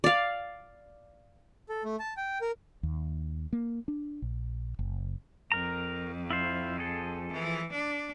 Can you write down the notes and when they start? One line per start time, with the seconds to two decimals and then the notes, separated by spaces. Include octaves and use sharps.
0.04 D5 F5
1.69 A4
1.84 A3
1.99 A5
2.17 G5
2.41 A#4
2.83 D#2
3.53 A#3
3.88 D4
4.22 A#1
4.79 F#1
5.52 F2 A#4 A#5
6.30 E4 F4 C5
6.78 F3 G#4 A4
7.32 E3
7.72 D4